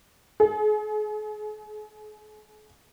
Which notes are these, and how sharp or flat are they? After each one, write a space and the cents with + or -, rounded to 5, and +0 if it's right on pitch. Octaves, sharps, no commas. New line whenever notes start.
G#4 +40